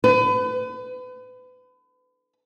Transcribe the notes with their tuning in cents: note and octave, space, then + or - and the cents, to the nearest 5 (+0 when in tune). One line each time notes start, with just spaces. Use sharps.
B4 +35